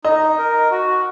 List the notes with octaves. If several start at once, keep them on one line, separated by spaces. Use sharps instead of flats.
D#4 D#5
A#4
F#4